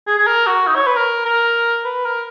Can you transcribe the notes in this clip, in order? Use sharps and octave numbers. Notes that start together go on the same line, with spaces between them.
G#4
G#4
A#4
F#4
D#4
C#5
B4
A#4
A#4
B4
A#4